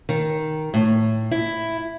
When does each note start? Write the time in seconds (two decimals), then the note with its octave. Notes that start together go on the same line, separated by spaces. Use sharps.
0.09 D#3
0.74 A2
1.31 E4